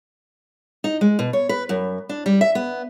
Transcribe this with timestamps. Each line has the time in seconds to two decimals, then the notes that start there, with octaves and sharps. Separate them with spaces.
0.84 D#4
1.01 G#3
1.19 B2
1.33 C#5
1.49 B4
1.69 F#2
2.09 D4
2.26 G3
2.41 E5
2.55 B3